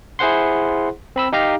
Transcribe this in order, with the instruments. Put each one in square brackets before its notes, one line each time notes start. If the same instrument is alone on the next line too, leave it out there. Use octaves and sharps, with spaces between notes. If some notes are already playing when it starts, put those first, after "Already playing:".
[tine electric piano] E4 G#4 C5 F#5 C6
C4 B5 E6
D#4 G4 F5 A#5